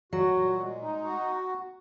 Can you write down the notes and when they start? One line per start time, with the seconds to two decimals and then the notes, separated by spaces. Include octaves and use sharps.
0.12 F#3 F#4
0.36 A#2
0.59 G#3
0.82 D#4
1.04 F#4